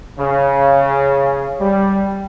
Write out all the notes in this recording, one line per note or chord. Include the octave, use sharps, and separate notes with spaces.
C#3
G3